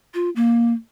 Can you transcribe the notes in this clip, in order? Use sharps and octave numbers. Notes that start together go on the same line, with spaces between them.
F4
A#3